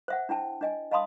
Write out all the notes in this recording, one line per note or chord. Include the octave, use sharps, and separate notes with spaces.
C5 E5 F#5
D4 E4 G5 A5
D4 D#5 G#5
D#5 F5 A5 B5 C6 D#6